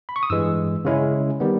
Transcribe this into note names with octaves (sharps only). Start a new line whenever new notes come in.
B5
C#6
D#6
G2 E3 G#3 E6
C#3 G#3 C#4 E4
D#3 G3 B3